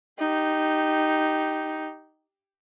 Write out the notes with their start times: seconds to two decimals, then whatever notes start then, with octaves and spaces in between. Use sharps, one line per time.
0.19 D#4 G4